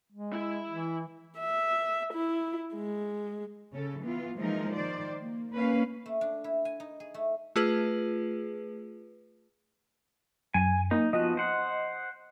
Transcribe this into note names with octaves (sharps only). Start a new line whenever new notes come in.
G#3
E4 E5
E3
E5
E4
G#3
C#3 C#4 A4
E3 B3 F4
E3 F3 G#3 A#3 D#4 A#4
D#3 C5 D5
A#3
A#3 C#4 B4 F5
A3
D4
E4
G#5
D#4
G#4
A3
A3 F4 G#4 B4
F#2 G#5
A#3 D#4
F3 B3 F#4 D#5
C5 F#5